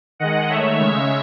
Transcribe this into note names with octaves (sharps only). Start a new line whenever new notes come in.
D#3 G#3 D#5 F#5
D#3 A3 C#5 E5
C#3 G#3